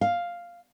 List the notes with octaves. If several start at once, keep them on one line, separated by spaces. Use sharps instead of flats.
F5